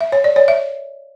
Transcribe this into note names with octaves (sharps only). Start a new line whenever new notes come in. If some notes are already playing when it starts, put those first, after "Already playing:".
E5
C#5
D5
C#5
E5